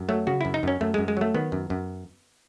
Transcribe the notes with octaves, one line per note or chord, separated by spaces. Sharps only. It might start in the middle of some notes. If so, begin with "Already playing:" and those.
Already playing: F#2
F#3 A3
C#3 F#4
F#2 E4
D#4
F#2 C#4
F#2 A3
F#2 G#3
G#3
F#3 A3
D#3 B3
F#2
F#2